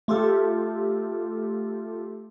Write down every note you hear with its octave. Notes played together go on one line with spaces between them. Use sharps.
A3 F4 G4 A4